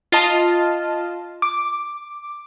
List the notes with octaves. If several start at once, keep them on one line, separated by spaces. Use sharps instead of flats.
F4 D#5 A5
D6